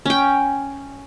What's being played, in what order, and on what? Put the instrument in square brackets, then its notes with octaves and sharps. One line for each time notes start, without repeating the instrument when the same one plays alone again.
[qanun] C#4 G5